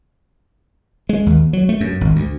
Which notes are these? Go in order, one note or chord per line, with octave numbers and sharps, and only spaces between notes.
G#3
D#2
F#3
A3
F#2
G#1
D2